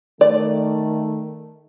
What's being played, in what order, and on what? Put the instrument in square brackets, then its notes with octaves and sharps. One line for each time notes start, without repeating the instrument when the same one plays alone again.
[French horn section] D#3 A3 [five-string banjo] D5